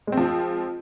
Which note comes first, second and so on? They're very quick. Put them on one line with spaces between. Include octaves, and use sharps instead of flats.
G#3 C4 F3